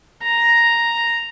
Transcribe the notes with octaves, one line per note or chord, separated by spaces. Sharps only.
A#5